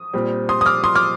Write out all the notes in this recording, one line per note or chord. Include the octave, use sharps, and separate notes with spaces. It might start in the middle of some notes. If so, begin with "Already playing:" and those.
Already playing: D#6
A#2 G3 C4
C6 D#6
D#6
D6 F6
C6 D#6
D6 F6